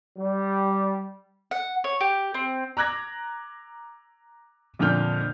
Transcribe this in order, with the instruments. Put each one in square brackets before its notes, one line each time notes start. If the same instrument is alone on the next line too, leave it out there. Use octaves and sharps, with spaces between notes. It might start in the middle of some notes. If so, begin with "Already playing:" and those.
[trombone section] G3
[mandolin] F#5
C#5
G4
C4
[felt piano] A#5 D6 F#6 G#6 A#6
F2 A#2 D3 F6 G6